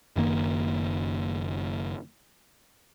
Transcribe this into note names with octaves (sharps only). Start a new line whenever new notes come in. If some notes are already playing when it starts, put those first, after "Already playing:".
F#1 F#2 D#3 A#3